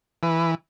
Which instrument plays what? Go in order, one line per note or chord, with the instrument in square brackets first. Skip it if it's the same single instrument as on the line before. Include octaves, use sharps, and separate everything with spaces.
[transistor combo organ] E3 B4